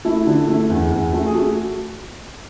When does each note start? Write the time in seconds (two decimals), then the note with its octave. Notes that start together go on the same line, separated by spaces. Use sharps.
0.05 A3 E4
0.26 D3
0.48 A3
0.70 E2
0.91 E2
1.13 A3
1.26 G#4
1.34 A3 F#4